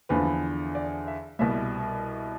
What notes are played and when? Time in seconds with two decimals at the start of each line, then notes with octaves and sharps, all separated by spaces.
0.09 E2 D3 F3 B4
0.75 D5
1.08 E5
1.39 C2 B2 G3 E5